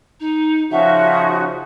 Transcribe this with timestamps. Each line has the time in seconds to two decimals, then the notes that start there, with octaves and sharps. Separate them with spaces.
0.20 D#4
0.71 C#3 F3 C#4 D#4 F#4 E5